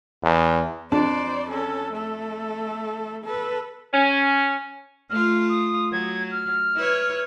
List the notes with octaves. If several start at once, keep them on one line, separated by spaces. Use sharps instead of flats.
E2
F2 D4 C5 D5 A5
C#4 A4
A3 A4
A4 B4
C#4
A3 F4 F6
D#6
F#3 G#6
F6
E4 B4 C#5